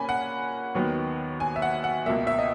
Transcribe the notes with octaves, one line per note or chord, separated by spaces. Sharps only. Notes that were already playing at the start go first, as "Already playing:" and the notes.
Already playing: A#2 A#3 C#4 G#5 B5
F#5
D#2 D#3 F#3 B3
G#5
E5
F#5
F#5
C#2 B2 A#3 E5
E5
D#5